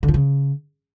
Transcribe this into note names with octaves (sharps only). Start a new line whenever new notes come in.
D3
F3
C#3